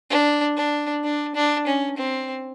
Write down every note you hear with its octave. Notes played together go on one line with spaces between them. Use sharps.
D4
D4
D4
D4
C#4
C4